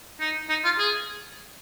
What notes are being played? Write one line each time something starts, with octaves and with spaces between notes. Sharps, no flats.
D#4
D#4
F4
G#4